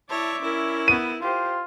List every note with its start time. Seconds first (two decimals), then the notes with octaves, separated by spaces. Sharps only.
0.10 E4 C#5 D5 E5 A5
0.41 C#4 E4 A#4
0.88 B3 D#7
1.21 F4 G4 C5